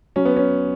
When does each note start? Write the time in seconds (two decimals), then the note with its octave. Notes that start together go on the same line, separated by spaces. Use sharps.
0.16 F#3 C#4
0.25 B3
0.36 C#4